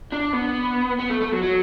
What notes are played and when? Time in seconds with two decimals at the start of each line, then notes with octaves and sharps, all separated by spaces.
0.12 D4
0.33 B3
0.99 B3
1.10 A3
1.21 A3
1.32 F#3
1.43 F#3